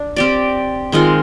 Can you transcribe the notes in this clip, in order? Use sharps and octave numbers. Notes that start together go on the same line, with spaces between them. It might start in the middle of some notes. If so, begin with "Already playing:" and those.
Already playing: D4
C4 G4 D5
D#3 G#3 C4 F4